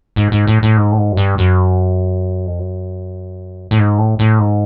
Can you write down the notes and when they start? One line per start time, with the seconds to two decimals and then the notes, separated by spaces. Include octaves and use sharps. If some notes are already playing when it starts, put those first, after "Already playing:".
0.16 G#2
0.32 G#2
0.47 A2
0.63 A2
0.77 G#2
0.92 A2
0.97 G#2
1.12 F#2
1.17 G2
1.38 F#2
2.47 F2
2.59 F#2
3.71 A2
3.78 G#2
3.98 A2
4.19 A2
4.39 G#2